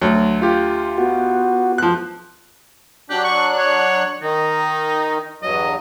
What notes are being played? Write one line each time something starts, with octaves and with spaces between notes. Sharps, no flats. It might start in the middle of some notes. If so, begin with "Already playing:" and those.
D2 F#3
F4 G4
B3 F#4
F3 F#6
F#3 D4 G4 F#6
C#6
C#5
D#3 D#4
E2 G2 F#3 D#5